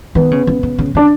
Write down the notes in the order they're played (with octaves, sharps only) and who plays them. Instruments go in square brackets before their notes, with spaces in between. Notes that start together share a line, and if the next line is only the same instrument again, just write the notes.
[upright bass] D#3 [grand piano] B3
[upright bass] C#3
C#3
C#3
C#3
[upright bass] C#3 [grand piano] D4